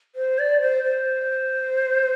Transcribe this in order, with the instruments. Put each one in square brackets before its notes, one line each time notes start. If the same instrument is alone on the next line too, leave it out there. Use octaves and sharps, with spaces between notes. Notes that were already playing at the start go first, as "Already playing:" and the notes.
[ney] C5
D5
C5
C5